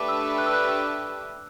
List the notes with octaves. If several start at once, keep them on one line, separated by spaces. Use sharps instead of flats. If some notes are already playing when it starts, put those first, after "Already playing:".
Already playing: A3 D4 G4 B4 E5 D6
E6
F#6
E6
F#6
E6